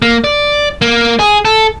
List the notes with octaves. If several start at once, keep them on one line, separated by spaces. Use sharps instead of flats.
A#3
D5
A#3
G#4
A4